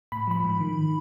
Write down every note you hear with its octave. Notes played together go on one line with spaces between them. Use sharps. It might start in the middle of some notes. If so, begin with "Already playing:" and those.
A2 B5
F3 B5
G#2
D#3